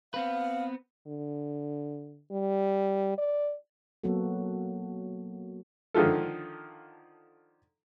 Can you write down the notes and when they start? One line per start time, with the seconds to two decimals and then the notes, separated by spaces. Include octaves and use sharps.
0.14 B3 C4 B4 F5
1.07 D3
2.31 G3
3.18 D5
4.04 F#3 A#3 B3 F#4 A4
5.94 D3 D#3 F3 F4 A4